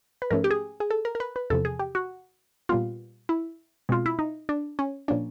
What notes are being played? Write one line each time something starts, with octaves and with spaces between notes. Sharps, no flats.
B4
G#2 F3 A3 C#4 A#4
G4
G#4
G#4
A4
A#4
A#4
B4
B4
E2 C3 F3 A4
G#4
G4
F#4
A#2 G3 B3 F4
E4
B2 G#3 C4 F4
E4
D#4
D4
C#4
A#2 F3 A#3 C#4 D4